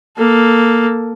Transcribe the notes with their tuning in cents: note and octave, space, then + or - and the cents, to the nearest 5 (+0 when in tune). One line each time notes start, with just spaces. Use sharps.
A#3 +0 A4 +5